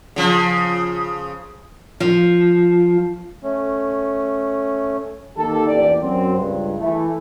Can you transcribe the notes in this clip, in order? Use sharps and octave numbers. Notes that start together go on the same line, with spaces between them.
C#3 F3
F3
A3 C#4
D#3 A#3 G4 A4
A1 E2 A#2 G4 D5
F#2 C4
C#2 G2
E3 A3